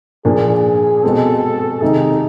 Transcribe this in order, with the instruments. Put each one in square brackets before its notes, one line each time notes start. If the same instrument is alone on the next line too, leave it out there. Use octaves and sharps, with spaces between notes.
[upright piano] A#2 F3 A#3 D4 [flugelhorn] G#4
[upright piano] B2 G#3 C4 [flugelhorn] A4
[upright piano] C3 D#3 G#3 [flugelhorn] D#4